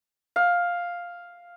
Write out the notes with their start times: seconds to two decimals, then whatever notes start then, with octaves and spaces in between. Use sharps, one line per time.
0.36 F5